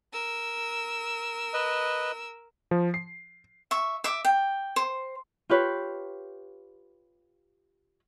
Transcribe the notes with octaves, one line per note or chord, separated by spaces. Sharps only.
A#4 E6
B4 D#5
F3
C7
E5 C#6
E5 D6
G5
C5
F4 G4 B4 C#5